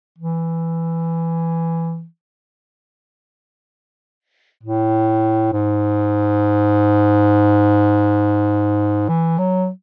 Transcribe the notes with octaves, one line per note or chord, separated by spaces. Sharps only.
E3
A2
G#2
E3
F#3